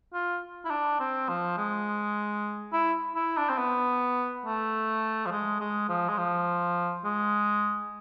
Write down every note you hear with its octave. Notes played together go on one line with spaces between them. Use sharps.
F4
E4
D4
C4
F3
G#3
E4
E4
D4
C4
B3
A3
F3
G#3
G#3
F3
G#3
F3
G#3